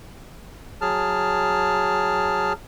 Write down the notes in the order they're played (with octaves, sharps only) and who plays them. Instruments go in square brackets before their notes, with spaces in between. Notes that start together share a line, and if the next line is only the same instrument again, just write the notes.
[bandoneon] F#3 G#4 A5 F6